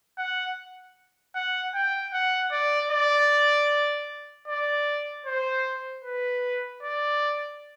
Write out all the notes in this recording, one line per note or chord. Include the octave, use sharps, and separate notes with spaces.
F#5
F#5
G5
F#5
D5
D5
D5
C5
B4
D5